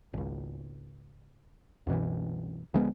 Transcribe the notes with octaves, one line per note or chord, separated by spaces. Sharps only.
G#1 C#2
C2 F#2 B2 E3
D2 F3 G#3 B3